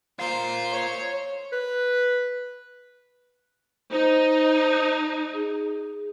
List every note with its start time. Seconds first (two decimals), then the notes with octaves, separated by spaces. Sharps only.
0.19 F4 A#4 C5
0.72 C#5
1.52 B4
3.92 D#4 C5
5.34 G#4